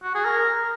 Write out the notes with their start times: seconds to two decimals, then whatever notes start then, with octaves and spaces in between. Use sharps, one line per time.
0.03 F#4
0.14 G#4
0.25 A#4